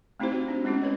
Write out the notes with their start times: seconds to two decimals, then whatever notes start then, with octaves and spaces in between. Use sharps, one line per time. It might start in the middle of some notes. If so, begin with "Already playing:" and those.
0.20 A3 C4 D#4 E4 G4 C5
0.32 C4 F#4
0.48 D4 D#4
0.64 G#3 B3 C#4 E4 G4
0.82 C4 B4 C#5 D#5